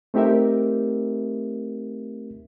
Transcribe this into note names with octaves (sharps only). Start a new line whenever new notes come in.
A3 C4 D#4 G4 A#4 E5